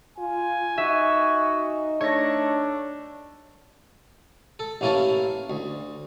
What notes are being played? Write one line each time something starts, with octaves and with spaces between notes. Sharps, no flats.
F4 G#5
D#4 F#4 E5
A3 D4 C#5 A#6
A4
A1 A#3 C#4 E4 A#4 A5
D2